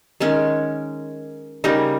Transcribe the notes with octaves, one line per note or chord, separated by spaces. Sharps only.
D#3 G#3 C#4
C#3 G3 A#3 D#4